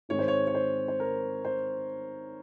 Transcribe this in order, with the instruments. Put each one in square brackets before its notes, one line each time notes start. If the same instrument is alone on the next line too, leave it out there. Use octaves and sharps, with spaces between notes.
[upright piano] G#2 D#3 G#3 C4 C#5
C5
C#5
C#5
C5
C5
A#4
C5